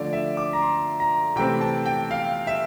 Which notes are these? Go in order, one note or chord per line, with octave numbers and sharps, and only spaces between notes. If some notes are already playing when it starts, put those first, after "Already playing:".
Already playing: D3 F3 A3 D5
E5
D6
A#5
C6
A#5
C3 E3 A3 C4 G5
A5
G5
F5
E5